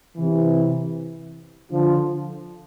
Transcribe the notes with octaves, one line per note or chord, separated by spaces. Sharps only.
C3 E3
D3 F3